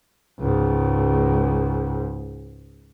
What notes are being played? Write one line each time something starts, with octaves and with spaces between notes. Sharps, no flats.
C#2 G#2